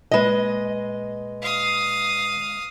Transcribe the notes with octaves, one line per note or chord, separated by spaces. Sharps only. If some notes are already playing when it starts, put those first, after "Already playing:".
A#2 G#3 B4 D#5
F5 D#6